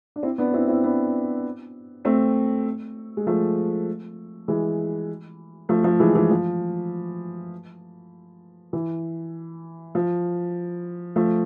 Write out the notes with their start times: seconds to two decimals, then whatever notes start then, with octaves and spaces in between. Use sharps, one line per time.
0.16 D4
0.23 C4 E4
0.38 B3 D4
0.54 C4 E4
0.68 C4 E4
0.83 B3 D4
2.05 A3 C4
3.17 G#3
3.27 F3 A3
4.48 E3 G#3
5.69 F3 A3
5.84 F3 A3
6.00 E3 G#3
6.14 E3 G#3
6.31 F3
8.73 E3
9.95 F3
11.16 F3 A3